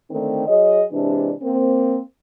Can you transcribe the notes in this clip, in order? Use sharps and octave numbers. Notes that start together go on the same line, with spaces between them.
D3 D#3 A3 C4 D4 D#4
F#3 G#4 C#5 D#5
C3 E3 G#3 D4
A#3 C4